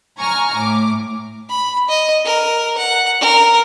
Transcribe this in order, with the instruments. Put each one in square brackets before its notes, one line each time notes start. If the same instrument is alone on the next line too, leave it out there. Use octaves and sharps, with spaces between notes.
[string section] G#5 A#5 C#6 F6
A2 D6
[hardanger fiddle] B5
D#5
A#4
F#5
A#4